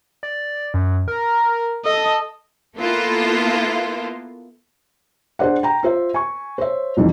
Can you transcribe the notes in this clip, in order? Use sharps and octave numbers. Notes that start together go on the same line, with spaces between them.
D5
F#2
A#4
A4 D#5
A#3 B3 E4 F4 A4
D4 G#4 C5 D5 F#5
G5 A#5
F4 C5 E5
G#5 C#6
C5 C#5 E5
C2 F2 D#3 E3